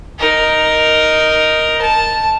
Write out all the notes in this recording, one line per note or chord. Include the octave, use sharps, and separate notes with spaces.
D#4 A#4
A5